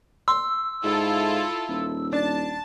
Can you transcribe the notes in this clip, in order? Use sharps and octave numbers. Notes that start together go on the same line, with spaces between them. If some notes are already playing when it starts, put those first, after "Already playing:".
C6 E6
G#2 E4 F4 A4
D#1
D4 A5